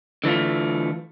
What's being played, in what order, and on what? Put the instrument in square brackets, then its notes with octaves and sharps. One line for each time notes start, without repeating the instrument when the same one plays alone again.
[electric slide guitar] D3 E3 A3 F4